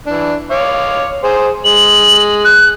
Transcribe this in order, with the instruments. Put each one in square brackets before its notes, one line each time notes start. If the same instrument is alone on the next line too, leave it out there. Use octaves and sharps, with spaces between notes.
[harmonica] E3 D4
C#5 F5 D6
G#4 C5
[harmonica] G#3 [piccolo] F#7
[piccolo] F#6